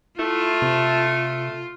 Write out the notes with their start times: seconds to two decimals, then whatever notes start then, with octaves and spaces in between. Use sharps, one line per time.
0.19 A3 E4 F4
0.62 C3